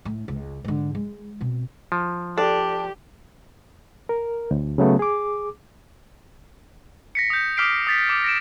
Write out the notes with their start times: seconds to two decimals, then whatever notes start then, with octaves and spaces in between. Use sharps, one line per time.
0.05 A2
0.28 C#2
0.64 G#2 D3
0.95 G#3
1.41 B2 C4
1.92 F3
2.38 D4 G4 A4 D5
4.09 A#4
4.51 D2
4.78 C#3 F#3 A3 B3
4.99 G#4 D6
7.15 A#6 B6 C#7
7.30 D#6 G6
7.57 D6 D#6 F6 B6 C7 D7
7.87 D#6 A6 B6
8.09 D6
8.24 A#6 D7 E7